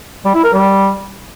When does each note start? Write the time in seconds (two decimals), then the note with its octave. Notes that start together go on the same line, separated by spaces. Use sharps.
0.25 G3
0.34 E4
0.44 A#4
0.53 G3